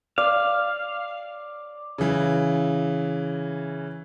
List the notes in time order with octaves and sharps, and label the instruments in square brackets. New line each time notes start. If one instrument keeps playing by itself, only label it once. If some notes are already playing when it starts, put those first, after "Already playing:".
[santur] D5 [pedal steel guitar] F5
[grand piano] C#3 E3